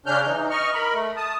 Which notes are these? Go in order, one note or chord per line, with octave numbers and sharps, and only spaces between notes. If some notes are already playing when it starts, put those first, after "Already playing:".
C#3 C#4 D4 F6 G6
E3 D#4
D#5 C#6 F6
A#4 B5
A3
A5 D#6